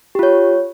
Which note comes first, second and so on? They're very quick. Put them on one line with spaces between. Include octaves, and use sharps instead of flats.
G4 F4 C#5